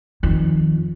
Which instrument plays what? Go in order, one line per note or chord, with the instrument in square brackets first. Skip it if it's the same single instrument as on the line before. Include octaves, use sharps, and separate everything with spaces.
[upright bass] F2 D#3